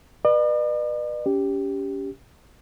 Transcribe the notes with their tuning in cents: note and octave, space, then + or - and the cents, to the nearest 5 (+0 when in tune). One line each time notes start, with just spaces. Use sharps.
B4 -20 D5 +45
C#4 +30 G4 +0